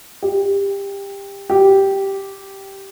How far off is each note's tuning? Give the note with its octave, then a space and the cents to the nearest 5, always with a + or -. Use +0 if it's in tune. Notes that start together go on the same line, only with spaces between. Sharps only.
G4 +20
G4 -5